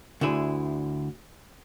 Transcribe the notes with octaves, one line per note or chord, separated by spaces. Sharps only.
D2 D3 E4 G#4